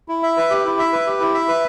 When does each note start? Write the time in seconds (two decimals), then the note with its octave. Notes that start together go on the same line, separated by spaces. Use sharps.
0.08 E4
0.23 E5
0.37 B4
0.50 G4
0.65 E4
0.79 E5
0.93 B4
1.07 G4
1.20 E4
1.34 E5
1.48 B4